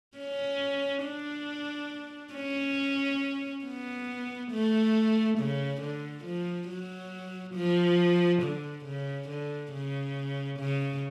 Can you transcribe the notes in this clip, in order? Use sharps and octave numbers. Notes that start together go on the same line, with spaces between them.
C#4
D4
C#4
B3
A3
C#3
D3
F3
F#3
F3
D3
C#3
D3
C#3
C#3